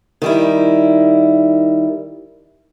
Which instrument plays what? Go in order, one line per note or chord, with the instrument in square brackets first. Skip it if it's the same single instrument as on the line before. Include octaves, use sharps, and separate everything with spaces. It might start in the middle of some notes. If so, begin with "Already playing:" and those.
[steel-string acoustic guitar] D#3 G3 E4